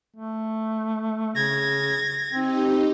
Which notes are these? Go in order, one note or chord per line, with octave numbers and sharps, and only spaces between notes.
A3
C#3 G#6 A#6
C4 D#4 G4